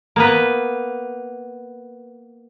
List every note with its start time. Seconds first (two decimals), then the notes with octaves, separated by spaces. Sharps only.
0.16 A#3 B3 B4